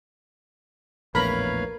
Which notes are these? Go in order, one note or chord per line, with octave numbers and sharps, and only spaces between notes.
A#1 E2 A2 A#4 B4 C#5 F5 B5